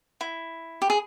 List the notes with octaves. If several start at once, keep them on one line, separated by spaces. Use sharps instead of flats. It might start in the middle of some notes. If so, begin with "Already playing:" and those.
E4
G4
G#4